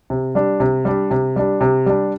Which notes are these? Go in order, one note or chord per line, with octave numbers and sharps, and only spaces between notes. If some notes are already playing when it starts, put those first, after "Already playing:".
C3
G3 D4
C3
G3 D4
C3
G3 D4
C3
G3 D4